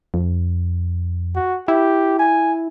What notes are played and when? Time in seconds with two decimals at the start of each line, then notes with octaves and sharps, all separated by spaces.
0.14 F2
1.36 F#4
1.68 E4 G4
2.20 G#5